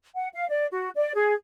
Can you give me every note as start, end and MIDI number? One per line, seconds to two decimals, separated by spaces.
0.15 0.27 78
0.34 0.45 77
0.48 0.66 74
0.71 0.89 66
0.96 1.12 74
1.15 1.33 68